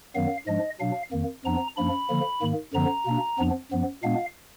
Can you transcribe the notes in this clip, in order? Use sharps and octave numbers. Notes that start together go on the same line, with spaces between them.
F#2 D#3 F#3 B3 F5
G#2 F3 G#3 D4 D#5
B2 F#3 D4 F5
F2 D#3 A#3
F2 F3 B3 D4 A#5
F#2 F3 A#3 D4 B5
D3 F3 A#3
G#2 D#3 A#3
F#2 D3 F3 B3 A#5
B2 A#3 D4
F2 F3 B3 D4
F#2 F3 B3
A#2 G#3 B3 D4 F5